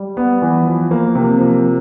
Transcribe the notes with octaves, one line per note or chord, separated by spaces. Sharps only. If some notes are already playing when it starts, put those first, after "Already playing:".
Already playing: G3
B3
E3
F3
A#3
C3
F3